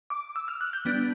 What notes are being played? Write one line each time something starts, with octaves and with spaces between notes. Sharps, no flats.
D6
E6
F6
F#6
G6
G3 B3 D4 F#6